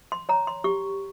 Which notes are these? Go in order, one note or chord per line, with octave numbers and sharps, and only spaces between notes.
C6
C#5 A#5
C6
G4 C#6